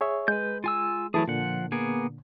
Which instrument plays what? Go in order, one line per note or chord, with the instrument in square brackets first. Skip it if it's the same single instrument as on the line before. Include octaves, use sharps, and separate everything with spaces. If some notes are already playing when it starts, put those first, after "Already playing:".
[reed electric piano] G#4 C#5 E5
[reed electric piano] G#3 [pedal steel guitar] B4 G6
[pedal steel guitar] F4 G#5 E6
[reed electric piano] E3 A3 A5 [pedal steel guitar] F#3 E4 G#4
[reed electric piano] A#2 D3 [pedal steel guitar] F3 F#5
[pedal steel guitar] A#3 B3 G#4